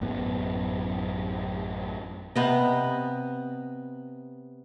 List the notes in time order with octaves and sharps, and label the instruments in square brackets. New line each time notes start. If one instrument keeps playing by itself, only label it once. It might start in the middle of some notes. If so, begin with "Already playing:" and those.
[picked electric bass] A1 F#2 A2 B3
[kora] C3 B3 D#5